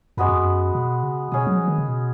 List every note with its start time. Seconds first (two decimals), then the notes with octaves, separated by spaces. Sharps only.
0.17 F#2 G#3 B3 F#4 B4
0.29 F2
0.40 F#2
0.75 B2
1.03 C#3
1.32 B2 C#4 G#4 D#5
1.47 F#3
1.57 F3
1.68 D#3
1.78 C#3
1.89 B2